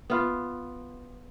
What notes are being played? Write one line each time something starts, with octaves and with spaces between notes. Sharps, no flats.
B3 F4